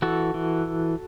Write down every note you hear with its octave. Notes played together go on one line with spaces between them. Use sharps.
E3 F#4 A4
E3